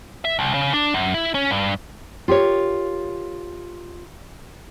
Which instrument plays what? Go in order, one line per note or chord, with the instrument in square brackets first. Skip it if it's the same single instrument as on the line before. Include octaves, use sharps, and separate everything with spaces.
[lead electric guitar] E5
C2
C#3
D4
F#2
E4
C#4
G2
[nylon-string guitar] F4 G4 A#4 C#5